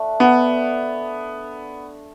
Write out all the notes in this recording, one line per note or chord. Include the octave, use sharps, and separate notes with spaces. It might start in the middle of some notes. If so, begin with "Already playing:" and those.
Already playing: A3 D4
B3